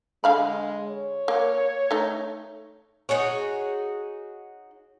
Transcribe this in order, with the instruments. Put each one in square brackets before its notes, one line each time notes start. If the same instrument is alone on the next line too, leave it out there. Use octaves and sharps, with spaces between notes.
[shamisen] D3 F5 B5 [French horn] G#3
[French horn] C#5
[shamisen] A#3
A3 D#4
[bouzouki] D#4 F#4 G#4 C#5